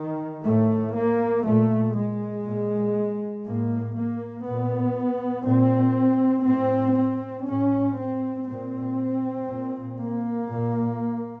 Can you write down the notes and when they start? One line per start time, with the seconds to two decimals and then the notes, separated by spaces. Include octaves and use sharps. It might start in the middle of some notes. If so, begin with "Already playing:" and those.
Already playing: D#3
0.44 A2 A3
0.95 A#3
1.45 A#2 A3
1.96 G#3
2.46 A#2
3.46 A2 A#3
3.97 A#3
4.46 A#2 B3
5.47 A#2 C4
6.48 A2 C4
6.98 C4
7.48 A2 C#4
7.98 C4
8.48 A#2 C4
9.49 A#2
10.00 A#3
10.50 A#2